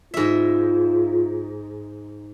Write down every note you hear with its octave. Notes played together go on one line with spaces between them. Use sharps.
G#2 F4 E5